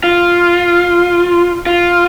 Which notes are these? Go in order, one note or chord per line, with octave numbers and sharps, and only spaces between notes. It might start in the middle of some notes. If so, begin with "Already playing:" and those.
F4
F4